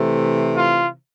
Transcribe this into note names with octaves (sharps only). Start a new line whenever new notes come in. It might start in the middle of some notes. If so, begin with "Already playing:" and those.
Already playing: C3 E3 A3
F4